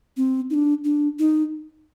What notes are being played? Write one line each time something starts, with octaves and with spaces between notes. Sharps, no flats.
C4
D#4
D4
D4
D#4